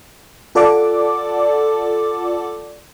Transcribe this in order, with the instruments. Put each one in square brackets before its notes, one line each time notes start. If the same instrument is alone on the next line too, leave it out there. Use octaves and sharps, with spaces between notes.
[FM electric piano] F4 A4 D5 F#5 A5 D6